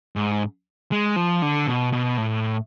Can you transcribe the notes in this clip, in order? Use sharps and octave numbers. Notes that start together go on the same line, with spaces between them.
G#2
G#3
F3
D3
B2
B2
A2